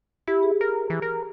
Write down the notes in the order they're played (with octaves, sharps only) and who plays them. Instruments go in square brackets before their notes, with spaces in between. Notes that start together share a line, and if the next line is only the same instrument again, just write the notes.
[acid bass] E4 [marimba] G4
[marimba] G#4
[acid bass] A#4
E3
A#4